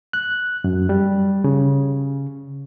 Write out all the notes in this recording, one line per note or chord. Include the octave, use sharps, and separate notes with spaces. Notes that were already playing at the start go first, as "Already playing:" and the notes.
F#6
F#2
G3
C#3